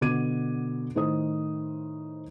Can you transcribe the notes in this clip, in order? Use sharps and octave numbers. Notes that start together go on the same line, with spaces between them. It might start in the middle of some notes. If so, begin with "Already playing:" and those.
B2 D3 F#4 D6 G#6 D#7
A2 D#3 C5 D#6